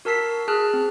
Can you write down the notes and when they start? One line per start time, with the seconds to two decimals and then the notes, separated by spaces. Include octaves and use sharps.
0.05 F#4 A#4 A5 E6 B6 C7
0.48 G#4 A5 F6 F#6
0.74 C4